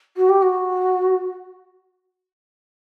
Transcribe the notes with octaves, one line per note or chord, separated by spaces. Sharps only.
F#4
G4
F#4